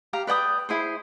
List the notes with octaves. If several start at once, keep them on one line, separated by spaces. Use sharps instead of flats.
G4 F5 A#5
B4 D5 G5 D#6
E4 G#4 C5